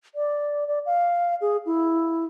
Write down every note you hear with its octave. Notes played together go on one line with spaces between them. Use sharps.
D5
D5
F5
G#4
E4